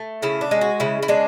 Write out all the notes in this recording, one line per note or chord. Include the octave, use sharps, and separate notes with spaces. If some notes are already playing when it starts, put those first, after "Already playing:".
Already playing: A3
C#3 E4
D4
G#3
F#4
C#3 E4
E4
G#3 D4